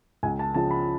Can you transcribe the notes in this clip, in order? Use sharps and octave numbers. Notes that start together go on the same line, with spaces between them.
C#2 G#5
A5
C#3 F3 A5
B5